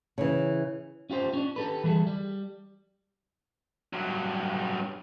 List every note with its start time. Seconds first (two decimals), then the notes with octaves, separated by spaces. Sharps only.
0.18 C#3 E3
1.10 C#4 F4 G4 C5
1.33 C#4 D4
1.56 G4 A4 B4
1.84 E3 G3 G#4 A4
2.07 G3
3.93 G2 F#3